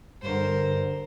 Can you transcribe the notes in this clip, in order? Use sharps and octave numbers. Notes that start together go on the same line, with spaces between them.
G2 D3 A#4 C5